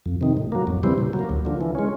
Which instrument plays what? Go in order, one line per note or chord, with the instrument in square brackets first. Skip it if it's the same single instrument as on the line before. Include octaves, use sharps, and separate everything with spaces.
[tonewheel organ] F2
C3 D#3
A2
F#3 A#3
F2
C#3 E3 G3 C4
A#2
F#3
A#3
D2
D3 F3
E3
G#3 C#4